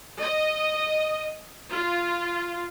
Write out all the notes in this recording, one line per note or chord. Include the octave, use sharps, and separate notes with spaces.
D#5
F4